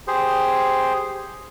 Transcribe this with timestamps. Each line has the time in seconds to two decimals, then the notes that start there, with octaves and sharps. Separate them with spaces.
0.08 G4 G#4 C5